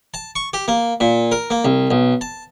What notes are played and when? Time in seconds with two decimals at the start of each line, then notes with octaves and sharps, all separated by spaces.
0.14 A5
0.36 C#6
0.53 G4
0.68 A#3
1.00 A#2
1.32 A#4
1.50 A#3
1.65 C2
1.91 B1
2.21 A5